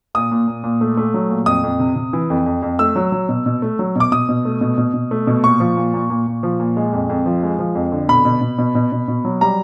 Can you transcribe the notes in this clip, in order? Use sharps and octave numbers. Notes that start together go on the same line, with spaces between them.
A#2 D#6
A#2
A#2
A#2
A3
A3
F#3
A#2
F2 D#6
F2
C3
C3
E3
F2
F2
F2
A3 E6
F#3
F#3
B2
B2
A3
F#3
B2 D6
B2 D#6
B2
A3
B2
B2
B2
A3
B2
A#2 C#6
F3
A#2
A#2
A#2
A#2
F3
A#2
G#3
F2
F2
F3
G#3
F3
F2
D3
B2 B5
B2
B2
B2
B2
B2
B2
F#3
G3 A#5